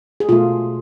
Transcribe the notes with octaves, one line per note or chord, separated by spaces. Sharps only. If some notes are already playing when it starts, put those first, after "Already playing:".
G#4
B2 A3 F4